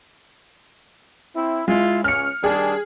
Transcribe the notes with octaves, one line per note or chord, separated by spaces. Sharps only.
C4 E4
G#3 E4 F4
C#2 C#4 F6 C#7
D#3 G3 D4 G#4